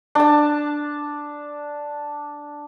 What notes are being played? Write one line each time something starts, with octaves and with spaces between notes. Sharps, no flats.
D4 A5